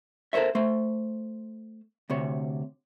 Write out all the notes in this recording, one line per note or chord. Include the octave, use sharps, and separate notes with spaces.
A4 A#4 C5 C#5 E5
A3 C5
D2 C3 C#5